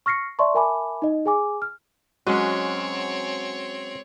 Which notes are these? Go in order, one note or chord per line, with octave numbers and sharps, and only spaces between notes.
C#6 F6 A#6 C7 C#7
D5 E5 A5 C6 C#6
A#4 E5 G#5 A5 B5 D6
D#4 D#5
G#4 G#5 D6
F6
F#3 G#3 C4 C#4 F#4 C#5